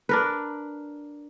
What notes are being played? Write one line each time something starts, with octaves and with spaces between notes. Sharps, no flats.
D4 A#4 B4